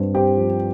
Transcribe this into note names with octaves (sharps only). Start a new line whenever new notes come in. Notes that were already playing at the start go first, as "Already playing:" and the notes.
Already playing: G2 C4
C4 G4
F3